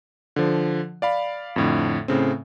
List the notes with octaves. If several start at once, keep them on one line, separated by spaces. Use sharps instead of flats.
D3 F3
D5 F5 B5
F2 A2 D3
A2 C#3 C4